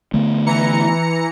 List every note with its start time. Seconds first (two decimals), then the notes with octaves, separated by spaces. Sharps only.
0.14 D3 A3 B3
0.46 E3 A#5 C#7